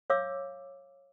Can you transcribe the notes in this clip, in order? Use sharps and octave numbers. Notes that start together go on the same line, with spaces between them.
C#5 F5 D6 E6